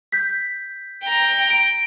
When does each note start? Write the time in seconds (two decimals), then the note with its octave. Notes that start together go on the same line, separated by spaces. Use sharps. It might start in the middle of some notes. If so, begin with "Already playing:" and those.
0.12 G6 B6
1.03 G5 A#5
1.50 D7